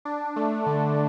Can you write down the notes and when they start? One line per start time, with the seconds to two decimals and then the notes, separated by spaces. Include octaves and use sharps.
0.05 D4
0.36 A3
0.66 D3